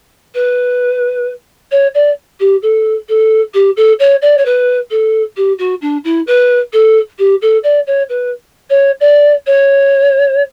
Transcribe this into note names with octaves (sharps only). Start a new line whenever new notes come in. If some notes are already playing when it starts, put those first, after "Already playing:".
B4
C#5
D5
G4
A4
A4
G4
A4
C#5
D5
C#5
B4
A4
G4
F#4
D4
E4
B4
A4
G4
A4
D5
C#5
B4
C#5
D5
C#5